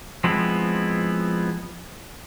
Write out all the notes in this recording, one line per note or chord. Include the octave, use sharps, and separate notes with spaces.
F3 G#3 B3 C4 E4